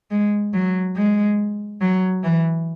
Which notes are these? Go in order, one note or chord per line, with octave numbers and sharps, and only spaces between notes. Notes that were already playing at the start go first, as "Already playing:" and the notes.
G#3
F#3
G#3
F#3
E3